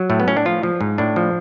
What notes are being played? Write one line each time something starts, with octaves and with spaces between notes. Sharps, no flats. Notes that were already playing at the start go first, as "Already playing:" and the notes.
Already playing: F#3
A2 A3
B3
A2 C#4
D4
F3 F4
F3
G#2
A2 D4
F3